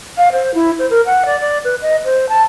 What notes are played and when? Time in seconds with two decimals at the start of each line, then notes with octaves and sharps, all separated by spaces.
0.17 F5
0.32 C5
0.54 E4
0.79 C5
0.90 A#4
1.06 F#5
1.25 D5
1.40 D5
1.64 B4
1.82 D#5
2.05 C5
2.29 A5